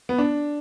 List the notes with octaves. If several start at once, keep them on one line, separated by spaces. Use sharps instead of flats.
B3
D4